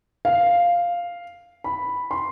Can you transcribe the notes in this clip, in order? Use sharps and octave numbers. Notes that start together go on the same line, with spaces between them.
F5
B5
C6